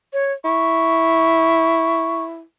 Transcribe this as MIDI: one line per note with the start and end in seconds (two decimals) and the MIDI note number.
0.13 0.33 73
0.45 2.42 64
0.45 2.24 85